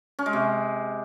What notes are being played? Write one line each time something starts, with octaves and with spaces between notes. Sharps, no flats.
C#4
G#3
C3